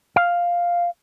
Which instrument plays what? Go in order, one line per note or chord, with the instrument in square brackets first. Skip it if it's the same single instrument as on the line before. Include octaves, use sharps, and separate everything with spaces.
[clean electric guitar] F5